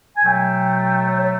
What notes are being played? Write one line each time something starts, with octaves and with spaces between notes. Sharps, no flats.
G#5
B2 F#3 A3 G5
C#5
C#5